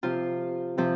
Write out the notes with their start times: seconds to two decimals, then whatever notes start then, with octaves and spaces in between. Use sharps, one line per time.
0.03 C3 F3 F4
0.78 C3 F3